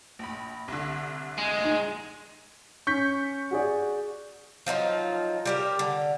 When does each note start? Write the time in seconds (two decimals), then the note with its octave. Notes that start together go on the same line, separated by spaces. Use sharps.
0.19 A#1 B5
0.68 C2 D3
1.38 G#3
1.61 A#1 D#4
2.87 C#4 C#6 G6 B6
3.51 F#4 G#4 D5
4.66 F3 F#3 D#4 F4
5.46 G3 G4 A#4
5.79 D3